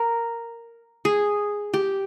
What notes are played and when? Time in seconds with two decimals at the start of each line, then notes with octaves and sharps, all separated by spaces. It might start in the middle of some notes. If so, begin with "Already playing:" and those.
Already playing: A#4
1.05 G#4
1.74 G4